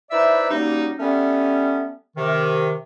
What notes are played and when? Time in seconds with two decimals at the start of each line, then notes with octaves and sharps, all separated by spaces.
0.11 D#4 E4 B4 C5 D5 E5
0.51 F#3 G3 A#3 C#4 D#4
0.99 G3 A3 B3 C#4
2.17 C3 D#3